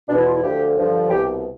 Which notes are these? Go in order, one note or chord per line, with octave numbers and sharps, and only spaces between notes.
E2 B2 D4 E4
F4
E4
D2 D3 F3 G4
G2 D3 F3
C2 B2 G4